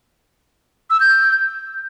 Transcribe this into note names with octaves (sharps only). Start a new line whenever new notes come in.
E6
G6